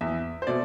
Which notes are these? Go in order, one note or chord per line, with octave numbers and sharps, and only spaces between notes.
E2 E5
C5
B2 A3 D5